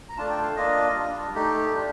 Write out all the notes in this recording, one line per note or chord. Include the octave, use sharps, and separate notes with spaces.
A#5
A3 D4 F4 A5
G5
F5
A#3 D4 F4 D#5
G3 D4 F4
A3 D#4 G4
G3 D4 F4